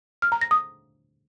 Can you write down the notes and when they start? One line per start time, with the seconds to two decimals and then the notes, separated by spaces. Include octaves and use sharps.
0.22 F6
0.32 A#5
0.41 A#6
0.51 D#6